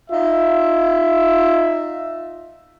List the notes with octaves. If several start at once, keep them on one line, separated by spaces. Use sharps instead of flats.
D#4 F4 E5